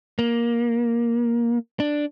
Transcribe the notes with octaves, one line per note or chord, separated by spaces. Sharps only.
A#3
D4